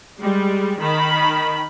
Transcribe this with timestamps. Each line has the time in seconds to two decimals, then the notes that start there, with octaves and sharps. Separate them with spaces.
0.21 G3 G#3
0.80 D#3 B5